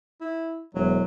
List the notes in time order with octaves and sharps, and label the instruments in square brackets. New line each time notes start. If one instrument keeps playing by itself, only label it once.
[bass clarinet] E4
[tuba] E1 [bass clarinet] F#3